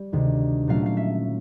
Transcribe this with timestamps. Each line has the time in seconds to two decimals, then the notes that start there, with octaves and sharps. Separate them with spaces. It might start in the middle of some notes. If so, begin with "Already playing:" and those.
Already playing: G3
0.13 D2 C3 D#3
0.68 A#2 F#3 A3 C#4 F5
0.86 F5
0.97 E5